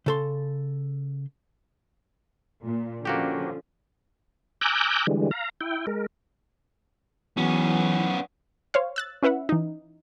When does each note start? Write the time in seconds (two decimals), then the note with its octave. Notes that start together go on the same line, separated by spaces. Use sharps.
0.06 C#3 A4 C6
2.63 A#2
3.05 D3 F3 A#3 C#4 F#4 G4
4.61 G#5 A#5 D6 E6 F#6 G6
5.07 D3 E3 G3 G#3
5.31 F5 A#5
5.61 E4 G5
5.87 G#3 A#4
7.37 E2 E3 F#3 B3 C#4
8.74 C5 C#5 F5
8.96 E6 F#6 A6
9.23 C#4 E4 B4 E5 F#5
9.49 E3 D#4